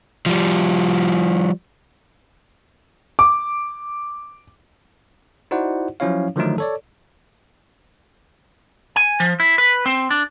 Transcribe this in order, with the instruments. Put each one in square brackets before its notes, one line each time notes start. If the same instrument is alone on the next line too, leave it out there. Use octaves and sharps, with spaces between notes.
[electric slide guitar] F3 G3
[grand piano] D6
[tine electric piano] D#4 E4 F#4 C5 D5 F#5
F3 F#3 C#4 E4 C#5 F5
D3 D#3 F3 F#3 A3 D#4
A4 C#5 D5
[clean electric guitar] G#5
F3
E4
B4
C4
D4